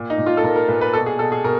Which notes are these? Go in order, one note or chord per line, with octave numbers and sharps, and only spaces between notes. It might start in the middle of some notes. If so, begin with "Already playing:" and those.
Already playing: A#2
D#4
A#2
F4
A4
A#2 A#4
A#4
A#2 B4
B4
B2 A4
G#4
B2 A4
G#4
B2 A#4